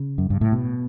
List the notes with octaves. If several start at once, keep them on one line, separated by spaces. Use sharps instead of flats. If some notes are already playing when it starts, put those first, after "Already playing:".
Already playing: C#3
F#2
G2
A2
B2